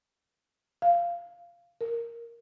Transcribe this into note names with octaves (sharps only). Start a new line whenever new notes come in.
F5
A#4